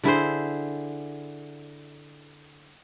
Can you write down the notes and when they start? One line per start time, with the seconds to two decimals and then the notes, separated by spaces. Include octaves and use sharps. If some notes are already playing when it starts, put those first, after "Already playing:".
0.04 D3 E4 G#4 C5